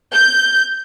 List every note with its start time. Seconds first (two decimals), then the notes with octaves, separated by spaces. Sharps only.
0.14 G6